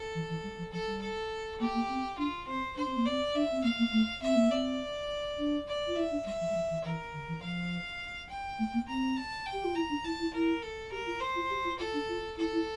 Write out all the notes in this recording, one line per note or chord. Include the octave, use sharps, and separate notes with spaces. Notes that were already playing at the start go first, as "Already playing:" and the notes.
Already playing: A4
E3
E3
G3
F3
F3 A4
G3
A4
A#3 G4
A#3
C4
D4 F4
C4 C5
D4 C5
C4
A#3
C4 D5
D4 E5
C4
A#3 F5
A#3
A3
C4 E5
A#3
C4 D5
D4
D5
F4
E4 E5
D4
G3 E5
F3
G3
F3
E3
E3 A#4
D3
E3
F3 F5
G5
A3
A#3
C4 A#5
A5
G5
G4
F4
E4 A#5
D4
E4 A5
E4
E4 A#4
A4
G4 A#4
F4
C5
F4
G4
F4
F4 A4
D4
F4
E4 A4
E4